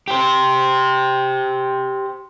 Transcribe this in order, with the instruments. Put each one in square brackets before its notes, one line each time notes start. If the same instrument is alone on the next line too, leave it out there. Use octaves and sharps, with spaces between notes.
[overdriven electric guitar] G4 C5